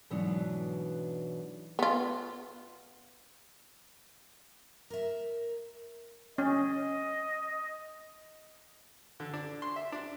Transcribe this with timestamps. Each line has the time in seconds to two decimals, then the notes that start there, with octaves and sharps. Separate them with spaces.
0.10 G#2 B2 E3 F#3 B3 D4
1.79 B3 F4
4.90 A#4 E5
6.38 C#4 D#5
9.20 D3
9.34 D4
9.62 C6
9.76 E5
9.92 D4